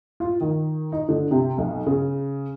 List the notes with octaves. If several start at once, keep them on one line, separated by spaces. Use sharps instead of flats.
F4
D#3
D#4
D3
C3
B1
C#3